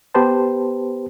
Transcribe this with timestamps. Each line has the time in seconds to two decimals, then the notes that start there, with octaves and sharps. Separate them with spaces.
0.14 B3 G4 B4 C5 A5